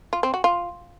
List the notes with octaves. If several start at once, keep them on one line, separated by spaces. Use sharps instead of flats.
F4
C4
F#4
F4